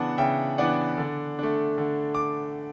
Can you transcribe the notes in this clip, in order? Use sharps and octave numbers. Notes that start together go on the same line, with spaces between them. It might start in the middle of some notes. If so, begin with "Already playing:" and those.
Already playing: C#3 E3 B3 D4 F#5 A5
C#3 E5 G5
E3 B3 D4 D5 F#5
D3
A3 D4
D3
D6